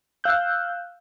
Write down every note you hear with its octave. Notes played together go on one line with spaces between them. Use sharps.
F5 E6 F#6 G6